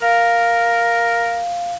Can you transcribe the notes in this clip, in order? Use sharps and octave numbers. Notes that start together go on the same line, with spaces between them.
A#4 F5